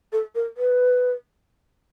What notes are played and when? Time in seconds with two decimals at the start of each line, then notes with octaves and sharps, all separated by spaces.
0.13 A4
0.35 A#4
0.57 B4